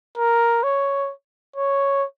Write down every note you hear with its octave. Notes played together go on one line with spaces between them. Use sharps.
A#4
C#5
C#5